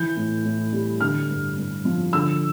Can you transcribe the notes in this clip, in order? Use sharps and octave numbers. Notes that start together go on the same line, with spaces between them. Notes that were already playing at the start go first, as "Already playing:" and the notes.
Already playing: E3 G6
A2
A2
G3
D3 F6
G2
G2
F3
D3 E6